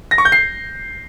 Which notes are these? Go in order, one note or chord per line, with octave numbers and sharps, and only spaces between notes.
A#6
C#6
G6
C7